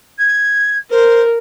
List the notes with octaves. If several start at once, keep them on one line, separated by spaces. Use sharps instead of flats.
G#6
A#4 C5